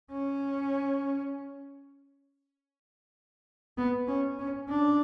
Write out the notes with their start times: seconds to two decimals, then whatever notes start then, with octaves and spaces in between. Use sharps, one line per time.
0.11 C#4
3.77 B3
4.08 C#4
4.39 C#4
4.69 D4